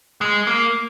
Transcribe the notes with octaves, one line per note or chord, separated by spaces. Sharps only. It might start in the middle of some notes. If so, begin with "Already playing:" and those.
G#3
A#3